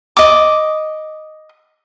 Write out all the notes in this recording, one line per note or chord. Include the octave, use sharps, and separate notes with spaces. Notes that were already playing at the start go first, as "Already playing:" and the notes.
D#5 D6